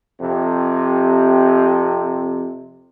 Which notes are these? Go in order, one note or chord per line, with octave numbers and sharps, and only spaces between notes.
F2 C3